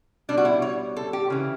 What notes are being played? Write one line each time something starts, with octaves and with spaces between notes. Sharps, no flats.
B2 G3 D4
F#4
E4
C#5
A4
G4
C#3 E3